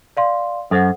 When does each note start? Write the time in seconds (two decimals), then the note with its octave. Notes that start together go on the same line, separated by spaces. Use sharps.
0.17 D5 F5 C6
0.71 F#2 A4 C5 F#5